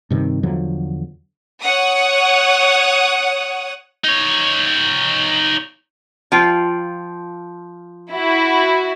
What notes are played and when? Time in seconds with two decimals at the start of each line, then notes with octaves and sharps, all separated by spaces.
0.10 G2 C3 D#3
0.43 E2 D3 F3 F#3
1.63 C#5 F#5 D#6
4.05 D#4 C#5
6.32 F3 F4 G5
8.12 E4 F#4